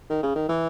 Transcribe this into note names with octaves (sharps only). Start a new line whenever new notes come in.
D#3
C#3
D#3
E3